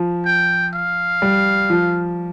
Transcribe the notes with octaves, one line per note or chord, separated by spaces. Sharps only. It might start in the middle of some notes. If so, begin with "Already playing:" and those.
Already playing: F3
G5
F5
G3
F3